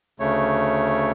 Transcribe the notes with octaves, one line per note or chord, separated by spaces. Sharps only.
D2 C#3 A3 C#5